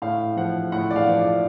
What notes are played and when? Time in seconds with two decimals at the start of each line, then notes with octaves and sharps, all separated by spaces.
0.02 A2 F5
0.37 F3 F#5
0.72 A2 F#5
0.91 D5
0.96 F5
1.07 F3
1.19 D5